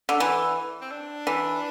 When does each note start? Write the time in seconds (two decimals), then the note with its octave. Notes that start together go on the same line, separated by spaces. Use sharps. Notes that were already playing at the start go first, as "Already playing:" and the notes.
0.09 D3
0.20 E3
0.81 C4
0.91 D4
1.27 E3